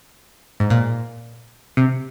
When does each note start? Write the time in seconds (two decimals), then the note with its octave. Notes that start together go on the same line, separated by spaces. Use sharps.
0.60 G#2
0.70 A#2
1.77 C3